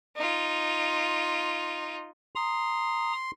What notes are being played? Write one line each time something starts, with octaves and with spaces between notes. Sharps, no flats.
D#4 F4
A#5 C6 D#6